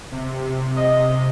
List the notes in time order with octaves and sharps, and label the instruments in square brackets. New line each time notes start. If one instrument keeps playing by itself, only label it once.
[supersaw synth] C3
[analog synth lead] D#5